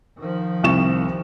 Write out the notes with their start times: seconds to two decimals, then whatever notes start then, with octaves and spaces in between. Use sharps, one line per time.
0.18 D#3 F3
0.64 C2 C#6 E7